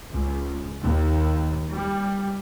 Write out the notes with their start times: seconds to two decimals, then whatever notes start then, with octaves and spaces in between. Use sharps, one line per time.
0.13 C#2
0.83 D#2
1.75 G3